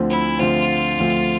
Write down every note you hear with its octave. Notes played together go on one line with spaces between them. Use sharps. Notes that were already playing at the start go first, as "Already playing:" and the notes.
Already playing: D2 D3 F3 A3 C4
E4
D2 D3 F3 A3 C4 F4
D2 D3 F3 A3 C4